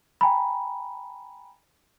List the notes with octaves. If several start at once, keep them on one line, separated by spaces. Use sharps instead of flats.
G5 G#5 A#5 B5